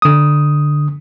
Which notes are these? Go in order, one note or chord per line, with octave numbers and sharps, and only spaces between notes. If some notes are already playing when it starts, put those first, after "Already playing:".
D3 D#6